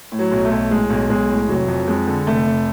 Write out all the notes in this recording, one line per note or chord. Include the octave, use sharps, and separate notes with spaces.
A2
F#3
B1
A3
B1
A2 G#3
B1
B1 G#3
A2
F1 F#3
F2
F2 G#3
D3
F1 A3
F1